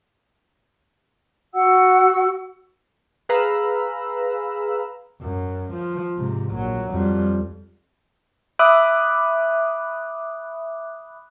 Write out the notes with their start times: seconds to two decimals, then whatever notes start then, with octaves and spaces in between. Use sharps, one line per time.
1.54 F#4 F#5 E6
3.29 G#4 B4 F5 A#5 B5 E6
5.21 F#2
5.73 F3
6.17 G#2 C3
6.51 A#1 F#3
6.90 F2 G3
8.59 E5 B5 D6 D#6 F#6